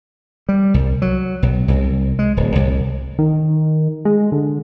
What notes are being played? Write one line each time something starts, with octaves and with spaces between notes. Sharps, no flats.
G3
C2
F#3
B1
C2
G#3
D1
C2
D#3
G#3
D3